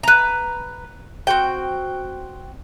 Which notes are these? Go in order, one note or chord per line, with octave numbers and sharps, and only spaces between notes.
B4 A#5
C4 F#4 G5